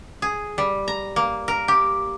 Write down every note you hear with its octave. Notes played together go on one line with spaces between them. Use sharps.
G#4
G3
A#5
A#3
A#4
G4